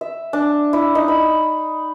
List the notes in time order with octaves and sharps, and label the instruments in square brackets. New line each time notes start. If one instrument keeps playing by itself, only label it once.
[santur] E5
D4
E4
D#4
B5